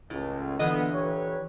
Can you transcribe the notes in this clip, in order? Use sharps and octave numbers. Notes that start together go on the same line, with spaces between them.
C#2 A2
A#2 D3 E3 B3 D#5
G4 B4 C#5